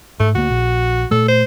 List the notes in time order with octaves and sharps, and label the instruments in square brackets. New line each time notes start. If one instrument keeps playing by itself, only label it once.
[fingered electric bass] G#2 [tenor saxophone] A3
[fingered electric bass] D2 A#3 [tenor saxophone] F#4
[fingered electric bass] A#1
[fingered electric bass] A#2 A3 [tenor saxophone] A4
[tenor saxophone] C5